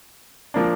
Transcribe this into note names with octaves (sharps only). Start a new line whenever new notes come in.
F3 A#3 D4